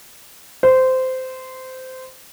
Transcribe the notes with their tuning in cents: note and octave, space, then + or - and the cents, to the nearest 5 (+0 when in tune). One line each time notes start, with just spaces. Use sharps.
C5 -15